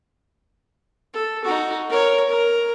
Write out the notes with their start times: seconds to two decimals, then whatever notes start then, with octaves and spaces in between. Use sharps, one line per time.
1.14 A4
1.45 D#4 F#4
1.90 A#4 C#5
2.29 A#4